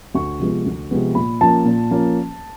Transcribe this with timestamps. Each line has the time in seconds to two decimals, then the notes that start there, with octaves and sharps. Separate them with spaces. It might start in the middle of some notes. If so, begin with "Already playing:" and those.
0.14 D2 C#6
0.39 C3 F3 G#3 B3
0.66 D2
0.91 C3 F3 G#3 B3
1.15 A#2 B5
1.41 F3 A#3 C#4 A5
1.65 A#2
1.91 F3 A#3 C#4